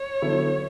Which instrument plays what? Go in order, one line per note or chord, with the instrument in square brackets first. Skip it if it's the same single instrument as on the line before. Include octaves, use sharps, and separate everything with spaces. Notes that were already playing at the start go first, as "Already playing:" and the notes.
Already playing: [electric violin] C#5
[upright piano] D3 F#3 B3 E4 A4